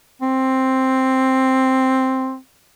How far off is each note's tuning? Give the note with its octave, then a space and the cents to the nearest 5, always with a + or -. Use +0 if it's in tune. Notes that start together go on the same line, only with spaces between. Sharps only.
C4 +5